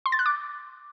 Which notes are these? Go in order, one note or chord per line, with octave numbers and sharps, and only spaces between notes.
C6
A6
F#6
D6